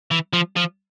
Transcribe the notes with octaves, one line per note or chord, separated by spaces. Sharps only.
E3
F3
F3